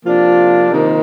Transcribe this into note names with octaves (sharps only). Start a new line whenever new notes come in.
C3 F3 A#3 D4 F4
C3 D#3 A#3 D#4